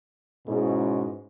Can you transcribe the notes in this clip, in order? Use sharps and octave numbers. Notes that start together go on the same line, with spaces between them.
G#2 B2 C#4 E4 G#4